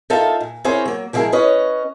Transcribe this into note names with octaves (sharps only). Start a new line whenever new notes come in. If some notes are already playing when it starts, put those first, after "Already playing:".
D#4 F4 A4 A#4 E5 F5
A#2
C4 E4 G#4 A#4 C5 C#5
F#3 A#3
F3 G3 G#3 E4 G#4 A#4
C#4 B4 C#5 D#5